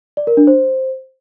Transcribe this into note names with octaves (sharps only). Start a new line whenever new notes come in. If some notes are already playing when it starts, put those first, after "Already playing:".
D5
A#4
D4
C5